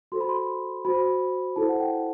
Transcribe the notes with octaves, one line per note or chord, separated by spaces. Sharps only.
F#4 A4 C5 C6
B5
C6
F#4 C5 B5
E4 A4 C5 A5
F#5
G5